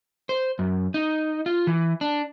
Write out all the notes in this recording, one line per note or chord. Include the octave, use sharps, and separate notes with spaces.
C5
F#2
D#4
F4
E3
D4